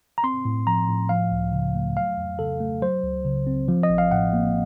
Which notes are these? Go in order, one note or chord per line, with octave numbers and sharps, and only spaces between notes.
A#5
C4 C6
A2
F3 A#5
A2
F3 F5
C#2
C#3
A3
F#3 F5
F2
C#3 A4
A3
F#3 C5
C#2
C#3
C4
F3
D#5
A1
F5
A2 F#5
A#3